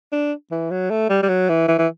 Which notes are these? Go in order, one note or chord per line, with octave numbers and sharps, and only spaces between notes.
D4
E3
F#3
A3
G3
G3
F#3
E3
E3
E3